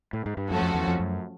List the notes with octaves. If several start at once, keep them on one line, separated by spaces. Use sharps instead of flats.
A2
G#2
G2
F#2 F3 A3 C#4 F#4 A4
F2
E2
F2
F#2